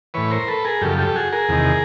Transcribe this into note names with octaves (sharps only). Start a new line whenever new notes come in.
A2 E3 B4 C#5
A#4 C5
A4 B4
G#4 A#4
F#2 C#3 F3 G4 A4
G4 A4
F#4 G#4
G#4 A#4
E2 C3 D#3